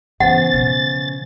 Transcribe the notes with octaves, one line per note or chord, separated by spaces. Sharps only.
C#3 E3 B3 C5 F#5 A6
B2 F3